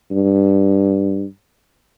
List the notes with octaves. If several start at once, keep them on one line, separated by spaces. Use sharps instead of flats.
G2